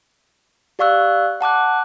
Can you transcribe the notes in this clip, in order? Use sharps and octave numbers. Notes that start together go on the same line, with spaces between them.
G4 D5 F5 C#6 E6 F#6
F#5 A5 D6 F#6